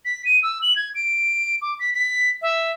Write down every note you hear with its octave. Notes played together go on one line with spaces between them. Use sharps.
B6
D#7
E6
F#7
G#6
D7
D6
B6
B6
E5